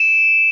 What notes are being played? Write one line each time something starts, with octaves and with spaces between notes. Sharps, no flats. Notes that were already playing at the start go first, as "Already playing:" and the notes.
Already playing: D7 E7